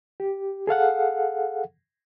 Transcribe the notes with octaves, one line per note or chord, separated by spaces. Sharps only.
G4
G#4 A4 F5 F#5